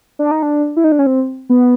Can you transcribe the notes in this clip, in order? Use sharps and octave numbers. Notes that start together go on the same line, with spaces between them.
D4
D#4
D4
E4
D#4
D4
C#4
C4
B3